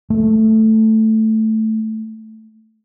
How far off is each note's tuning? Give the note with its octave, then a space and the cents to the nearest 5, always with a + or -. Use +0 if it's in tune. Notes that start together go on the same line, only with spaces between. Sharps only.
A3 +0